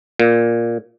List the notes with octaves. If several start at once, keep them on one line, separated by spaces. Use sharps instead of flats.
A#2